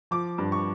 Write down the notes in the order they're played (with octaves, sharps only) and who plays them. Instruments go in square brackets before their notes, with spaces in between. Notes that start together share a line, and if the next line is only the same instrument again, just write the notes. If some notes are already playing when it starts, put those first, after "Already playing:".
[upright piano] F3 D6
G2
C#6